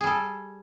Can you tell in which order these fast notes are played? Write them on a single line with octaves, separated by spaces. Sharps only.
G#4 G3 A4